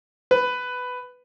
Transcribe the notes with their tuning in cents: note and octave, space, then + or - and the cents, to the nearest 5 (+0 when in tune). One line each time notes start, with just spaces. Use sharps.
B4 +10